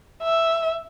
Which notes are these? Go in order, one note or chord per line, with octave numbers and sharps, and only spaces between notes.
E5